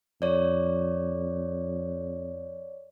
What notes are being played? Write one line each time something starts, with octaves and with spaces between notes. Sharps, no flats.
F2 C#5 D5